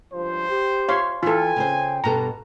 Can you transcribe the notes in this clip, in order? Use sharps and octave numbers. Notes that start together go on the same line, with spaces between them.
C#2 G2 F3 C5
G4
F4 C#5 E5 F5 C6
E3 E4 F4 A4 G5 G#5
C#3 C4 C5
G2 B2 A4 A#5